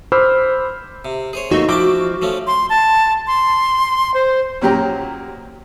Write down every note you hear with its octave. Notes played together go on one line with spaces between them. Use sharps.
C5 B5 D6 E6 F6
C3
G#4 C5 C#5
E2 A3 A#3 D#4 F#4
F3 E4 G5 A5 D6
F3 A3 C#4
C6
A5
C6
C5
F#2 A#2 F#3 G4 G5 A#5